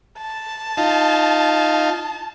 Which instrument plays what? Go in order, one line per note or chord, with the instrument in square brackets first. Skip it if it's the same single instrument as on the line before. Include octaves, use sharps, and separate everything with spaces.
[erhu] A5
[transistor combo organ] D#4 F4